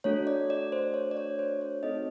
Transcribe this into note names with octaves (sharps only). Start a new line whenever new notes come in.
A3 D4 F#4 A4 C#5
D5
D5
C5
C#5
D5
C#5
C5
C#5
C4 D#4 F#4 A4 D#5